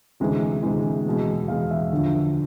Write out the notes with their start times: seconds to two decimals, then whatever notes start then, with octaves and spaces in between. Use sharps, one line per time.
0.20 D2 C3 E3 G#3
0.63 D2 C3 E3 G#3
1.06 E2 B2 G#3
1.48 E2 B2 G#3 F5
1.71 E5
1.92 D2 D3 F3